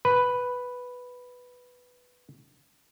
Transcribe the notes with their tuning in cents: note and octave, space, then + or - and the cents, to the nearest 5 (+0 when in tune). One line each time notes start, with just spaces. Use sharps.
B4 +0